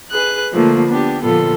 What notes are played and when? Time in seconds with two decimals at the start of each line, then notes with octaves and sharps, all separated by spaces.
0.11 G#4 B4 F#6
0.52 D3 F3 A3 A#3
0.89 B3 D4 G4
1.23 A#2 D3 F3 B3 F4 A4